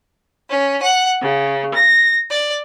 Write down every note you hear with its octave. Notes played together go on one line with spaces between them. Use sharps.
C#4
F#5
C#3
A#6
D5